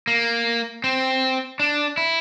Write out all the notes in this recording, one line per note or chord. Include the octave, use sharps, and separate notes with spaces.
A#3
C4
D4
E4